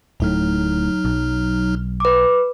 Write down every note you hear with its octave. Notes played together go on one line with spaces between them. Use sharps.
D1 A2 F#3 D#4 F6
B1
B4 D6